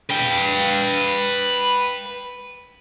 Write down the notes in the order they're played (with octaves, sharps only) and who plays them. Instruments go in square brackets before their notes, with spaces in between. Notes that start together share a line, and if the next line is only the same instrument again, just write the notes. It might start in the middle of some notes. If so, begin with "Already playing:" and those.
[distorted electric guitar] B4 G5